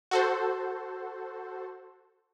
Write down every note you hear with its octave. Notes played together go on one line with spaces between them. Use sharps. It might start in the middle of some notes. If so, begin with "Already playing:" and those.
F#4 A4 C5